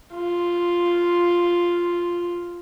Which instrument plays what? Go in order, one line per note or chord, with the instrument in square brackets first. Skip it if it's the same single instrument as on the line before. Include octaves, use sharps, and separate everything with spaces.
[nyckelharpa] F4